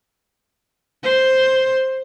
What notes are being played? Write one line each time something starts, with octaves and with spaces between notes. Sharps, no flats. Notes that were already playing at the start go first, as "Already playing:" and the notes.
C5